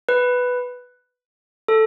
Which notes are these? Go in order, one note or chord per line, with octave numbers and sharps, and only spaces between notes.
B4
A4